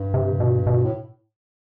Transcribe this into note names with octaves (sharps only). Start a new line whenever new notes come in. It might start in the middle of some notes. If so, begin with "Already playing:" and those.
Already playing: G2
C3
B2
B2
A2